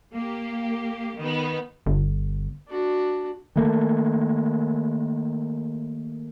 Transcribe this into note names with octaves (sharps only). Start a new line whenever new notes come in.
A#3 G4
D#3 B3
G1
D4 F#4
D#3 A3 A#3